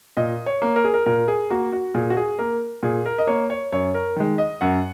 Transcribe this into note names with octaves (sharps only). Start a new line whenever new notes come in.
A#2 D#5
C#5
A#3
A#4
G#4
A#4
A#2 A#4
G#4
A#3 F#4
F#4
A#2 G#4
F#4
G#4
A#3 A#4
A#2 G#4
A#4
D#5
A#3 C#5
C#5
F#2 C#5
A#4
D#3 G#3
D#5
F#2 F#5